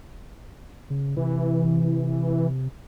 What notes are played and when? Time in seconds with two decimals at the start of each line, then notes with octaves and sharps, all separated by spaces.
0.90 C#3
1.17 C3 E3